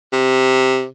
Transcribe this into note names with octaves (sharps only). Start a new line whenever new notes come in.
C3